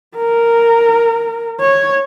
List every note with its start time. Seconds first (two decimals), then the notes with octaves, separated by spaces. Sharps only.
0.17 A#4
1.61 C#5